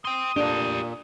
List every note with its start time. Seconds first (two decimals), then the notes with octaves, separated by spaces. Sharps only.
0.05 G5 C6 D#6
0.36 A#2 D4 G4 F5